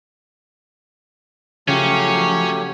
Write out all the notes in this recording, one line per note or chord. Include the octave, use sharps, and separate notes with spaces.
C#3 F3 F#3 A3 C#4 G4